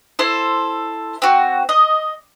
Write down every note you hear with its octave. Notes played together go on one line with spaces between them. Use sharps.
E4 A4 C5
C4 F#4
D#5